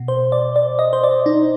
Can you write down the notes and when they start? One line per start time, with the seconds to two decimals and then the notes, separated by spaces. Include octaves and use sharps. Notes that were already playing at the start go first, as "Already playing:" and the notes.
Already playing: B2
0.08 C5
0.32 D5
0.56 D5
0.79 D#5
0.93 C5
1.03 D5
1.26 D#4